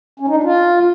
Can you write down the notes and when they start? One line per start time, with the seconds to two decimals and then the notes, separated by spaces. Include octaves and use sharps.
0.20 C#4
0.28 D#4
0.36 D4
0.44 F4